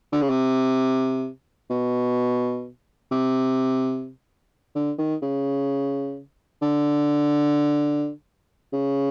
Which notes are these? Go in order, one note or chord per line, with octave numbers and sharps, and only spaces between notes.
D3
C#3
C3
B2
C3
D3
D#3
C#3
D3
C#3